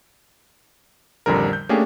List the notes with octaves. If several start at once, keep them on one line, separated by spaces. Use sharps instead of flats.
A1 F2 D3 G3 A#4
G6
A3 A#3 C#4 D4 G4 G#4